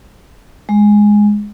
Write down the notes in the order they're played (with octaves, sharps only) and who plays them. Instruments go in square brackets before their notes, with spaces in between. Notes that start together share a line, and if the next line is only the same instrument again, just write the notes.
[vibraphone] G#3